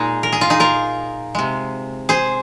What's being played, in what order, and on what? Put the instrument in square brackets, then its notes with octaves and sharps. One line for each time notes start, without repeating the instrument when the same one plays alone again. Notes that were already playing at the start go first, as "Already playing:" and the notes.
Already playing: [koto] A#2 G#3 D#4 G#4
A#4
G#4
F4
D#4 G#4
F4 A#4
C3 G#3
G#4 C5